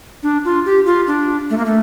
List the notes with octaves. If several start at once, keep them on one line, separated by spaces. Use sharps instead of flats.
D4
F4
G4
F4
D4
A3
A#3
A3